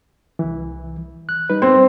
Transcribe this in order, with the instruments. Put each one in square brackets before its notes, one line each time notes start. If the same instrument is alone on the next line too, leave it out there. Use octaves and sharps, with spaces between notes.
[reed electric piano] C2 E3
F#6
G3 D#4 B4
[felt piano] C4